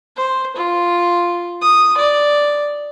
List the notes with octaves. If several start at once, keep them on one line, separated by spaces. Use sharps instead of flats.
C5
F4
D#6
D5